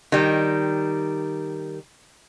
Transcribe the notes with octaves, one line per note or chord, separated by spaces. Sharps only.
D#3 G3